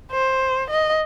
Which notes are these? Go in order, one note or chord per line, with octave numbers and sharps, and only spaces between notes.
C5
D#5